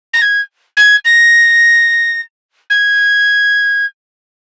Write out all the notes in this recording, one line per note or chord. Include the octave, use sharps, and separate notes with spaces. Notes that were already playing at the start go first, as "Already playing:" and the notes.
A#6
G#6
G#6
A#6
G#6